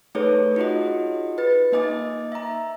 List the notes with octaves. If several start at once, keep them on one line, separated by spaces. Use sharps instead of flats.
A3 D#4 G#4 A4 B4 C#5
D#4 F4 F#4 G#4 D#5
B4 A6
A#3 D#4 D#5 G#5 D6 A6
E5 A#5